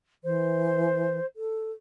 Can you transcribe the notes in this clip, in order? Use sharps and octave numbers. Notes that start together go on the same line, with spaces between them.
E3 C5
A4